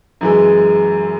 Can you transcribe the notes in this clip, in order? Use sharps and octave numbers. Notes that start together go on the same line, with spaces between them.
F#2 E3 G#3